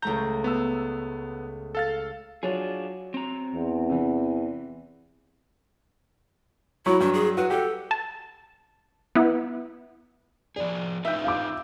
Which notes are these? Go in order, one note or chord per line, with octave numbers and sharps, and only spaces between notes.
C#2 A3 A#5 G6
B3 E6
A4 F5 A6
F#3 D4 F4 G#4 C#5
C4 A#5
E2
C3 E3
F#3 E4 A#5 C#6
G2 D4
G#4
F#4 B4
G4 A4
A5
B3 E4
F3 G#4 D5
D#4 F4 B4 E5 G5
F5 D6